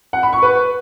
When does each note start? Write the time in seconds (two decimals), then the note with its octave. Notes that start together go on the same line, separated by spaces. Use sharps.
0.13 F#5
0.23 B5
0.33 C#6
0.42 B4